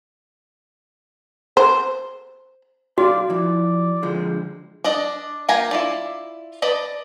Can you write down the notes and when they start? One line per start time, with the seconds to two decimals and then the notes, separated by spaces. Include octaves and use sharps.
1.57 C5
2.98 B1 F#4 D5 F5 C6
3.29 F3 E4 D5
4.03 D3 F3 G#3
4.84 D4 D5 D#5
5.48 A#3 F4 G4 G#5 A#5
5.71 E4 F4 D5
6.62 B4 D5 D#5 A5